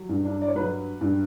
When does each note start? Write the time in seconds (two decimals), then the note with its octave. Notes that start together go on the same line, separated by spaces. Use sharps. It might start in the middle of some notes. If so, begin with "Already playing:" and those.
Already playing: F#3
0.09 G2
0.25 D4
0.42 D5
0.48 C#5
0.55 F#3 B4
1.01 G2